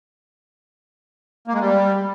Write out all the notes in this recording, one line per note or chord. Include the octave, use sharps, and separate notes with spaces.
A#3
G#3
G3